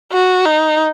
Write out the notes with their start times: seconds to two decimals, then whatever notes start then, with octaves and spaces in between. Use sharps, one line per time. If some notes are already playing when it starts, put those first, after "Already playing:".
0.12 F#4
0.45 D#4